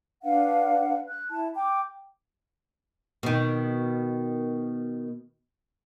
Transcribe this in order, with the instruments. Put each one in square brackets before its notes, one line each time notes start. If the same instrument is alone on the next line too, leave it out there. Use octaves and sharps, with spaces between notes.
[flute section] D4 B4 F5 F#5
F#6
E4 A5
G5 D6
[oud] B2 D#3